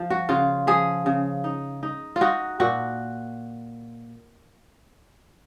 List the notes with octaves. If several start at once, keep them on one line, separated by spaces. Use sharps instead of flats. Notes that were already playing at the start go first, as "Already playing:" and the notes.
Already playing: F3
F#4
C#3 F4
F3 G#4
C#3
D#4
D#4
F4
D#4 F#4
A#2 F#4